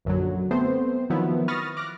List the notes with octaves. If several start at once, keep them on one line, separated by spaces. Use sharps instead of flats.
A#1 F#2 D3 F#3
A3 B3 C4 C5
D#3 F3 F#3 B3 E4
B5 C#6 D#6 F6 A6 A#6
D6 F6 F#6 A#6